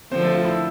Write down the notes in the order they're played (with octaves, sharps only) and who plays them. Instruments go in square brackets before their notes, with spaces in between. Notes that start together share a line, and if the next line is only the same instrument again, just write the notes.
[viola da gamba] D3 F3 [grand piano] C4 C5
[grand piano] A3 A4
F4
E4